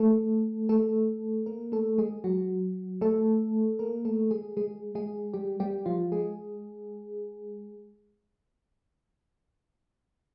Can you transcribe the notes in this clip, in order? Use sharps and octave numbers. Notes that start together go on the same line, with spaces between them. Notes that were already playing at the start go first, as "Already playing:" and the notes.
Already playing: A3 A4
A3 A4
A#3 A#4
A3 A4
G#3 G#4
F#3 F#4
A3 A4
A#3 A#4
A3 A4
G#3 G#4
G#3 G#4
G#3 G#4
G3 G4
G3 G4
F3 F4
G#3 G#4